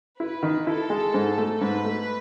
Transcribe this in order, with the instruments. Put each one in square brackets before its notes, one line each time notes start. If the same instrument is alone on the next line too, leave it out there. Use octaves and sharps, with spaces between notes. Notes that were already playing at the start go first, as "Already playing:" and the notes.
[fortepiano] E4 [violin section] B4
[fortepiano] D#3
[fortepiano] E4 [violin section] A4
[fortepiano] G#3
G#2
A3
[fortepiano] G#2 [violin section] B4
[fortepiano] A3